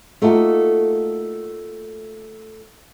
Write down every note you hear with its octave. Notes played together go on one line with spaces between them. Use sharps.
A3 A#3 D#4 F4 F#4 A4